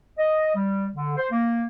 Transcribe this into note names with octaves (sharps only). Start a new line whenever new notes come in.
D#5
G3
D3
C5
A#3